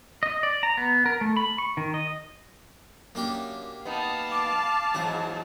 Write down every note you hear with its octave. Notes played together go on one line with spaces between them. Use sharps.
D#5
D5
A#5
B3
A#4
A3
B5
C#6
D#3
D#5
F#2 A#3 D4 G4
B3 D#4 F5 A5
D6
E2 G#2 F#3 G#4